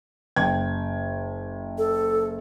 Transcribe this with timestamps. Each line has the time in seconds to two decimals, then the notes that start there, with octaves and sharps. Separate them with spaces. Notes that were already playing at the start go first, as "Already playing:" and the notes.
0.36 F#1 G5 G#6
1.78 A4